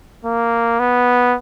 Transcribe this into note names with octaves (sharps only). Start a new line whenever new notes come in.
A#3
B3